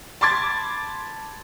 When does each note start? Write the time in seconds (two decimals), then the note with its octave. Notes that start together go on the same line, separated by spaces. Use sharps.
0.21 A5 B5 C6 D6 G#6 A6